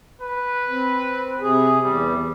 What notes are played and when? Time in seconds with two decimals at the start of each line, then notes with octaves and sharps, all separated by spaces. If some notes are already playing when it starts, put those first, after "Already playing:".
0.22 B4
0.69 C4
1.41 C3 G#4
1.84 E2 G3